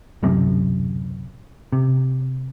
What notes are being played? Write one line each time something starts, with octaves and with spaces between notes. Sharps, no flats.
D1 B1 F#2 C3
C3